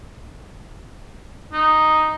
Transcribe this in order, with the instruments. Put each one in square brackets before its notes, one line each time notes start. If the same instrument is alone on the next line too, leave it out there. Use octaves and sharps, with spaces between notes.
[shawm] D#4